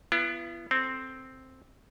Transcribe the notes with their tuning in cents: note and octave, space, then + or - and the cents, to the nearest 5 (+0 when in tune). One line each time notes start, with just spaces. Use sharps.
B3 +0 E4 +45
C4 +0 A4 +0